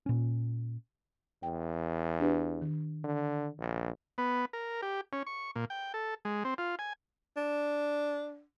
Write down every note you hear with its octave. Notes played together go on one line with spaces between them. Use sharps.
A#2 C#4
E2 G5
D4 G4 B4
D#3
D3
A#1
B3
A#4
G4
C#4
C#6
A#2
G5
A4
G#3
C4
F4
G#5
D4